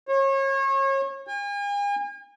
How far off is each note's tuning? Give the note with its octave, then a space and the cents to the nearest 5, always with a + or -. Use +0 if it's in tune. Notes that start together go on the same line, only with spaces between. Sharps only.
C#5 -35
G#5 -45